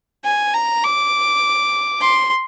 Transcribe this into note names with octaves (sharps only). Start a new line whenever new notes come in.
G#5
A#5
D6
C6